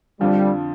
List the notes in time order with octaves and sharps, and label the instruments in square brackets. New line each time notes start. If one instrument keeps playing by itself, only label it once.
[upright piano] F2 D3 F3 [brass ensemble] G3